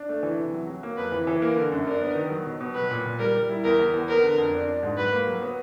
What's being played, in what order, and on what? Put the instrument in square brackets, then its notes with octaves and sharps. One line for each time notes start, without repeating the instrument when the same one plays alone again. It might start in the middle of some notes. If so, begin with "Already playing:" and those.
Already playing: [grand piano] D4
A3
E3
C3
F#3
F#3
A#3
[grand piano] F2 [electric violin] B4
[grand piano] E3
E3
[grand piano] A#3 [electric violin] A#4
[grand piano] D3
F#2
[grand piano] D4 [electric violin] A#4
[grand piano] B3
D#3
F#3
B2
B2
[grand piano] F#3 [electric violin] B4
[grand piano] A#2
A#2
[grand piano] G3 [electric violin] A#4
[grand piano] G3
E4
[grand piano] E2 [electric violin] A#4
[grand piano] E2
E2
[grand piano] B3 [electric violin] A#4
[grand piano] D3
F2
D4
D4
G#2
[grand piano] F#3 [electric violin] B4
[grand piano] A#3
F#3
B3